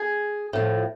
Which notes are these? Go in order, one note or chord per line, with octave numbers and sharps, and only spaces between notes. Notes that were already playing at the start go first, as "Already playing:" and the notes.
Already playing: G#4
A2 F3